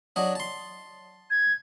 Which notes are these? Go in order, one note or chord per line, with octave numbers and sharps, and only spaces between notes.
F#3 D4 D#5
A5 C6
G#6